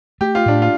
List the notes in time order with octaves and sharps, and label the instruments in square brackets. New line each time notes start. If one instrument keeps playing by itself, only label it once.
[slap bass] A3 [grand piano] G4
[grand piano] F4
[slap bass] A2 [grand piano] D4
[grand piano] F4